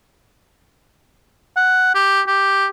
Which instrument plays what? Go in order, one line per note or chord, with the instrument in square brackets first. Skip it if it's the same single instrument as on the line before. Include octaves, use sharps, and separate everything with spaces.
[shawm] F#5
G4
G4